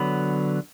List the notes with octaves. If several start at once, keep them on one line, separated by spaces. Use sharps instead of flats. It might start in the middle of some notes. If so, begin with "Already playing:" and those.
Already playing: D3 F#3 B3 B5